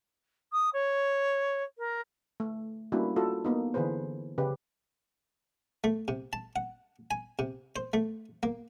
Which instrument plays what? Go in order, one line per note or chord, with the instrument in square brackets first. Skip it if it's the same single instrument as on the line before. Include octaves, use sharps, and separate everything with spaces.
[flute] D#6
C#5
A#4
[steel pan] A3
G3 A#3 C#4 D4 E4 F#4
F4 F#4 A4
A#3 B3 D#4
D3 E3 G#4 B4 C5
C#3 G4 B4
[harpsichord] A3
C3
A5
F#5
G#5
C3
C5
A3
A#3